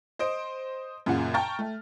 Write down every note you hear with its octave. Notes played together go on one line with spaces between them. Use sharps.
C5 D#5 D7
F#2 A#2 C#3 F4 F#5
G5 A5 A#5 C#6 F6 A6
A3